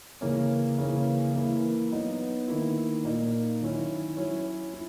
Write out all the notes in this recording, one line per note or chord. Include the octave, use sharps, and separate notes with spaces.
C#3 E3 A#3 C#4
C#3 E3 A#3 C#4
E3 A#3 E4
F#3 B3 D#4
D#3 A#3 E4
A#2 A#3 D#4
D#3 F#3 C#4 E4
F#3 C#4 E4
E4